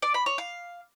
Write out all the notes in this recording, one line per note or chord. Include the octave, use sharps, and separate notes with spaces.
D5
B5
C#5
F5